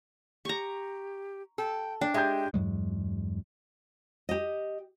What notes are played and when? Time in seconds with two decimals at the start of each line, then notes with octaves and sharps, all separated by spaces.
0.45 G4 A#5 C#6
1.58 A4 G5
2.01 D4 G5
2.14 G#3 G4 E5 G5 G6
2.54 E2 G2 F#3 G#3
4.29 G4 D#5